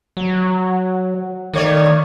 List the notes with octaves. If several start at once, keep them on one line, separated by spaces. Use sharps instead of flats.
F#3
D#3 A3 C#5 D5